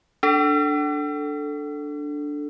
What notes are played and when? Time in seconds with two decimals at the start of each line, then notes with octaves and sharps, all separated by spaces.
0.23 D4 A4